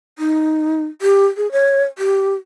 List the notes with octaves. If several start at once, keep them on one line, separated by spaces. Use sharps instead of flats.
D#4
G4
G#4
C#5
G4